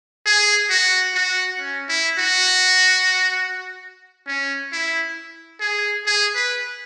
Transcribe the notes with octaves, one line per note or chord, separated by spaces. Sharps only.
G#4
F#4
F#4
C#4
E4
F#4
C#4
E4
G#4
G#4
B4